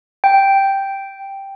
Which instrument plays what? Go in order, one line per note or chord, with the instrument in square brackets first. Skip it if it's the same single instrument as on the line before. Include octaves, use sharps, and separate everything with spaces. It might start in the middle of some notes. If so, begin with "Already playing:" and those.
[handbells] G5